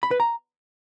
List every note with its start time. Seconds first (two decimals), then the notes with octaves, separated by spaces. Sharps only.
0.03 B5
0.11 B4
0.20 A#5